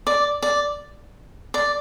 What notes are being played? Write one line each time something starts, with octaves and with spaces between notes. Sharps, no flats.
D5
D5
D5